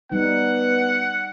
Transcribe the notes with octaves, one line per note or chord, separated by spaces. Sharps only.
G3 B3 D#4 F#5